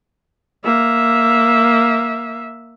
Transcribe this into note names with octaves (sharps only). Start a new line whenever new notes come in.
A#3 E5